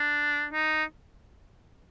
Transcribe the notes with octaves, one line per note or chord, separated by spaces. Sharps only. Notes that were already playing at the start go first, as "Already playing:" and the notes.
Already playing: D4
D#4